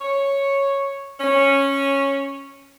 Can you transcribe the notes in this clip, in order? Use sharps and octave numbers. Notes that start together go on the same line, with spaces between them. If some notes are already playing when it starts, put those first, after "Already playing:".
C#5
C#4